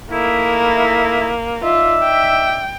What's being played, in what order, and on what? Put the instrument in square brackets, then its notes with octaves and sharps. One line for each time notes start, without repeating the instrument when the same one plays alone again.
[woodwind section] A3 D#4 E4 [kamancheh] A#3
[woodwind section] D#4 D5 E5 [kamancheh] F4
[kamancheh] G5